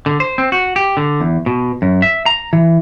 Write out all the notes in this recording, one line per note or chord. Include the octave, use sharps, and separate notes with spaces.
D3
C5
C4
F#4
G4
D3
E2
B2
F#2
E5
A#5
E3